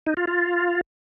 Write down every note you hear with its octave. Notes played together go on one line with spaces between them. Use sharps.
D#4
F4
F4